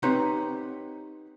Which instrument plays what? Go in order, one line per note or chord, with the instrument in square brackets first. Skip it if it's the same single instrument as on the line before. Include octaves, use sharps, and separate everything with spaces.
[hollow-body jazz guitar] C4 D#4 G4 B4 C#5 F#5